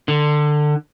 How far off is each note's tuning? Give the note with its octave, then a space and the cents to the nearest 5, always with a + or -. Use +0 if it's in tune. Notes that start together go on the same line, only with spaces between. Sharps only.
D3 +20